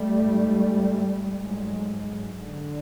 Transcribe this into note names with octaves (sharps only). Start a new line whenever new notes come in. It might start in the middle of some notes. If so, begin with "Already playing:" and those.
Already playing: G3 A3
G#2
G#2 F#3 G#3
D3